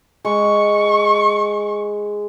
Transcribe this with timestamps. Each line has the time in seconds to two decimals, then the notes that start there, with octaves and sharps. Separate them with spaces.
0.25 G#3 C#6